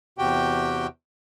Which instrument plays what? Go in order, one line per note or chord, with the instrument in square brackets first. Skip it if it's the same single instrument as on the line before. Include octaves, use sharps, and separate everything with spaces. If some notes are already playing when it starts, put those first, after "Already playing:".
[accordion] E2 C3 F#4 G4 G5